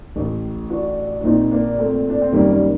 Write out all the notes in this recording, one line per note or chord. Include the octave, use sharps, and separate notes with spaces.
A1 A2
D4 F#4
D4
A#1 A#2 C4 D#4
A#3 D4
A3 C4
D4
C4
F#1 F#2 D#3 G3 A#3
G3